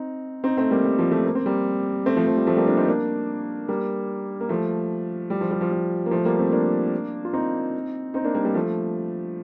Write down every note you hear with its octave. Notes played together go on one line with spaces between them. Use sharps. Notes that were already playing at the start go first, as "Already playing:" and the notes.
Already playing: C4 D#4
C4 D#4
A3 C4
G3 A#3
G3
F3
F3 A3
A#3
C4
G3 A#3
A3 C4
F3 A3
F3
G3
F3 A3
G3 A#3
A#3 D4
C4 D#4
A#3 D4
G3 A#3
A#3
F3 A3
G3
F3
G3
F3
G3
A#3
F3 A3
G3 A#3
A3 C4
A#3 D4
F4
C4 D#4
C4 D#4
A#3 D4
G3 A#3
G3 A#3
F3 A3